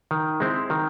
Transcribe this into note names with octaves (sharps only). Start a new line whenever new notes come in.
D#3
G#3 C4 E4
D#3